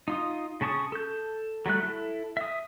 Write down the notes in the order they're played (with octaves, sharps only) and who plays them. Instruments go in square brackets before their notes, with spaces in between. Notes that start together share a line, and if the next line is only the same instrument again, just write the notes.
[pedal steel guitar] D#4 F4 D#6
C#3 C#4 A5 C#6 D#6
A4 G6
F#3 G3 A3 F#6
E4 A4
E5 D#6